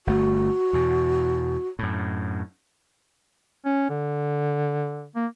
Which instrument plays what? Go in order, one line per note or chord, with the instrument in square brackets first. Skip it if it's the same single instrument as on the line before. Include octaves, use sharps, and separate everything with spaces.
[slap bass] G1 A3 [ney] F#4
[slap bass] E2 B2
F#2 A2
[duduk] C#4
D3
A#3